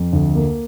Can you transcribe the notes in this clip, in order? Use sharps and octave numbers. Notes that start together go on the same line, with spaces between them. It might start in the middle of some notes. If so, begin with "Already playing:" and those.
Already playing: F2
D2
A#3